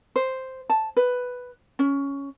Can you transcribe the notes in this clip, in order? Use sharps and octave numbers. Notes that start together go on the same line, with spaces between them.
C5
A5
B4
C#4